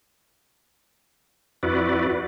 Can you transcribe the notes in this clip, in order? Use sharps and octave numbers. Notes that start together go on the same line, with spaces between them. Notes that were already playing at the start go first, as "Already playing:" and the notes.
F2 E4 F#4 B4 D5